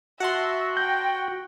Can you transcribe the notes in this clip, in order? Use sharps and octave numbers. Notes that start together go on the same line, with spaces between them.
F#4 E5 F#5 A5 C6
G5 G6